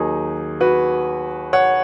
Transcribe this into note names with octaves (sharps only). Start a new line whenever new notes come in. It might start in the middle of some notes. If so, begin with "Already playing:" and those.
Already playing: D#2 D#3 F#3 D#4 G#4
F#4 B4
C#5 F#5